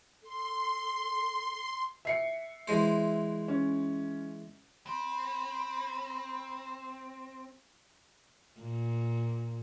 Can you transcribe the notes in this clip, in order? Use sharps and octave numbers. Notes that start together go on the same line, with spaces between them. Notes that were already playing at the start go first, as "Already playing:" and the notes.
A4 C6
E5 C7 C#7
E3 G#3 C5
C#4
C4 B5
A#2